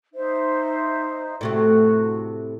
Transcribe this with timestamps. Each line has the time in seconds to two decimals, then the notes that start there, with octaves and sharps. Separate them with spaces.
0.15 D#4 C5 E5
1.41 A2 C3 A3 F#4